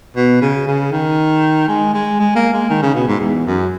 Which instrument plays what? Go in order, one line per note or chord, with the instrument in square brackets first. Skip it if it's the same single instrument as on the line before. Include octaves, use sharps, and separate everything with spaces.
[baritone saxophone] B2
C#3
C#3
D#3
G#3
G#3
G#3
A#3
G#3
D#3
C#3
B2
G#2
E2
F#2